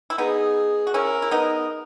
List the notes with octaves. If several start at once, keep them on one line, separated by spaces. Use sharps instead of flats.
E4
B3 D#4 G#4
F#4
C#4 E4 A#4
E4
B3 D#4